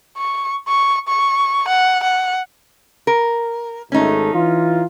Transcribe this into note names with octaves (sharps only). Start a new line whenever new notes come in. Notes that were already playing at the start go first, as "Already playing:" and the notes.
C#6
C#6
C#6
F#5
F#5
A#4
G#1 G#3 A3 C#4 D#4
E3 F4